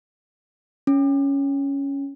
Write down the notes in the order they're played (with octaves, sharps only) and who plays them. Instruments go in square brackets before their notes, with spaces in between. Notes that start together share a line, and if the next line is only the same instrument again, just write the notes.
[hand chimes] C#4